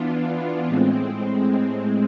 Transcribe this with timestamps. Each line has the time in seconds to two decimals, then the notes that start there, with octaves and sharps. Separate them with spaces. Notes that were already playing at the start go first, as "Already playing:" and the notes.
Already playing: E3 B3 D4 F4
0.67 A2 G#3 C4